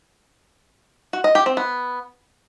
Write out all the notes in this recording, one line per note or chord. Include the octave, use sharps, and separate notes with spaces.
F#4
D#5
G4
C4
B3